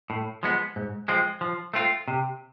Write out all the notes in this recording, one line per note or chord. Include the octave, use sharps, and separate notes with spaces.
A2
F3 G#3 B3
G#2
F3 G#3 C4
F3
A3 C4 F4
C3